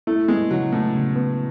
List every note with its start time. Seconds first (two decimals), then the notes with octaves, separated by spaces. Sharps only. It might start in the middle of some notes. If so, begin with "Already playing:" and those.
0.07 A3 E4
0.28 G#3 B3
0.51 C#3 F#3
0.72 A2 B3
0.95 C#3
1.16 B3